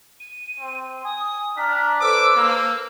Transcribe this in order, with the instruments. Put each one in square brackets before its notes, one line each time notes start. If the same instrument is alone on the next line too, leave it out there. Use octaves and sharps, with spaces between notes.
[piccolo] D#7
[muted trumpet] C4
[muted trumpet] G#5 [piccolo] D#6
[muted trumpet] D4 [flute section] G5 A#5 F6 [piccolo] B6
[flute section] A4 B4 C5 [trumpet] D6 [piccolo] E6
[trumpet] A#3